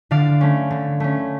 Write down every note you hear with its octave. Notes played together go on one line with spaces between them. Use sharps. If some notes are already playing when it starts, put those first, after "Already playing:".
D3 D5 F5
A3 C#4
D3
A3 C#4